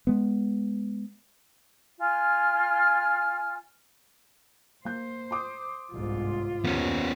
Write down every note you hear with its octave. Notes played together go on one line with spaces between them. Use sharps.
G#3 B3
F4 G#5 F6
A#3 C5 G6
C6 D6 D#6
G1 C2 G#2 F4
D#2 B3 C#4